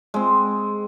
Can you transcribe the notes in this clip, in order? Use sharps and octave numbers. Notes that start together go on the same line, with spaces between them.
G#3 C4